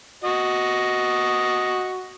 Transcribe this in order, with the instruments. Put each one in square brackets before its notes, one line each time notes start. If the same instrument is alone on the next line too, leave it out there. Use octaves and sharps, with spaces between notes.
[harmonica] F#4 D#5